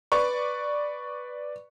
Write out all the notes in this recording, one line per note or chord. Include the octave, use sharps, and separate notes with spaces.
B4 D5 C#6